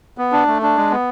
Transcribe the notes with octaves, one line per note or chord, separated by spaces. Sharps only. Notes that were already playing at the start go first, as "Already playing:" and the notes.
B3
D4
A3
D4
G#3
B3